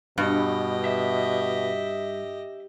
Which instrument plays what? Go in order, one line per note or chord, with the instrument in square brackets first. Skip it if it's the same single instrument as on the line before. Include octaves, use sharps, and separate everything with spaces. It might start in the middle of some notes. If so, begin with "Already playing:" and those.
[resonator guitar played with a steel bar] G2 [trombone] B2 [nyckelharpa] G4 D#5
[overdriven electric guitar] E5